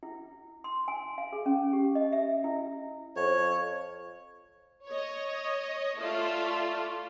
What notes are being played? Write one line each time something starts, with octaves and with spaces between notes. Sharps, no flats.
E4
C6
G#5
F5
G#4
C#4
G4
D#5
E5
E4
F2 C#5
C#5 D#5
A3 F4 D5